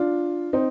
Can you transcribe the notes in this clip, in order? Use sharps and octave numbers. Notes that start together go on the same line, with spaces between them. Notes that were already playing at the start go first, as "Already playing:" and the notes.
Already playing: D4 F4
C4 D#4